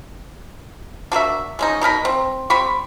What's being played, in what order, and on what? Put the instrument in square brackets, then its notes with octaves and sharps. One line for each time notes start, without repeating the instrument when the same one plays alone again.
[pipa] D4 F#4 A#4 E5
G#3 C#4 D#4
B2 D#4 A#4 B5
C4
G3 C4 B5 C#6